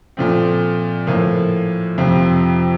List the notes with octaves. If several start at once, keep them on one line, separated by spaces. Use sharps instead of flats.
A#2 F3 A3 C4
A2 F3 A#3
F2 C3 F3